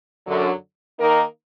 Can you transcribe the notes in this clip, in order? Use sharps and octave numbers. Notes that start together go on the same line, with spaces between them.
F#2 D3 F#3
D#3 A#3 D#4 A#4